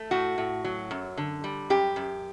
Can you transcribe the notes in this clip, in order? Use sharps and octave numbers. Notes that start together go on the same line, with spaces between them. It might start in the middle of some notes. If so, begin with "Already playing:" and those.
Already playing: A3
A2 F#4
A2
F#3
F#2
D3
G3
F#2 G4
F#2